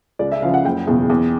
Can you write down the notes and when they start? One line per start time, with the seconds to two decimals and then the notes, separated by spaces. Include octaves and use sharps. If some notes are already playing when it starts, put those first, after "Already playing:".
0.19 C#2 D5
0.32 E5
0.42 C#3 F3 F5
0.54 F#5
0.64 F#1 G5
0.87 E2 B2
1.10 E2